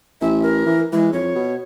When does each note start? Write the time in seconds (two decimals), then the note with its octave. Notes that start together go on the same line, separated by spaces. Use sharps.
0.21 A1 E5
0.42 A#4
0.66 E3
0.93 E3 G#3
1.13 F2 C#5
1.35 B2